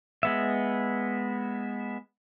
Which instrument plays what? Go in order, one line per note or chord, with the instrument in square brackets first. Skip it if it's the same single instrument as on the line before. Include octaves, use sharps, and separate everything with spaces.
[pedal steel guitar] G#3 B3 E5